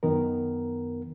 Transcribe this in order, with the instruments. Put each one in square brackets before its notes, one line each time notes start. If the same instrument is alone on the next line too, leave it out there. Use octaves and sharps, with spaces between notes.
[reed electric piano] F#2 D#3 B3 A#4